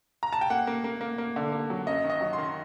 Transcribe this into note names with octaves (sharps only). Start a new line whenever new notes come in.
A#5
A5
G5
A#3 F#5
A#3
A#3
A#3
A#3
D3
A#3
F#3
F#2 D#5
D#3
D#5
F#3
C6
D#3